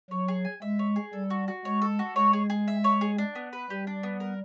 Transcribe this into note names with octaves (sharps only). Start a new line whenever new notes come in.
F#3 C#5
G#4
G#5
G#3 E5
C#5
G#4
G3 A4
F#4
F#4
G#3 C#5
A4
F#4
G#3 C#5
G#4
G#4
E5
C#5
G#4
D4
B3
B4
G3 G4
D4
B3
A#4